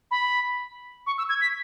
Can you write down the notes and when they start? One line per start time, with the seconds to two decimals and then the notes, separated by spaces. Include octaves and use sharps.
0.11 B5
1.07 C#6
1.18 E6
1.29 G#6
1.41 B6